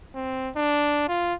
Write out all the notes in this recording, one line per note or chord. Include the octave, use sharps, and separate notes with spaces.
C4
D4
F4